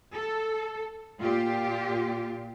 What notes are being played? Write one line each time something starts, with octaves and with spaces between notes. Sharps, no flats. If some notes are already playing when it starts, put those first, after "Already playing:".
A4
A#2 F4 G4